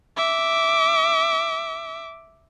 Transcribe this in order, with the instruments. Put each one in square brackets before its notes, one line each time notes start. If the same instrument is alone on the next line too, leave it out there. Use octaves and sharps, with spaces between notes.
[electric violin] E5 D6